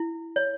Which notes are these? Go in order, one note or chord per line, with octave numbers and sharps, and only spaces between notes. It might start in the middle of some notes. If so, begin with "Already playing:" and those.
Already playing: E4
C#5